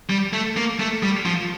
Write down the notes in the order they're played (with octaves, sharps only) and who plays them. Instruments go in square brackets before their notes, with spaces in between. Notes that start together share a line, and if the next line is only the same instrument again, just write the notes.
[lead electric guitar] G3
A3
A#3
A3
G3
F3